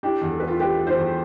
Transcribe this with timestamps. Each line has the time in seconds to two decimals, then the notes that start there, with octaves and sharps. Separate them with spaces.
0.03 D4 E4 G4
0.22 E2
0.31 A4
0.40 D4 B4
0.47 F4 A4
0.59 D4 G4 B4
0.77 A3
0.87 A4 C5
0.97 E2